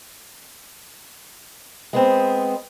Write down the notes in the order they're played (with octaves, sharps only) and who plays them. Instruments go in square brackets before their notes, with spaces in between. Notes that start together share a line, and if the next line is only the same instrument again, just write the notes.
[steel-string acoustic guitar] G#3 B3 C4